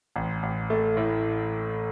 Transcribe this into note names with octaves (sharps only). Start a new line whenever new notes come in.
A1
A1
A3
A2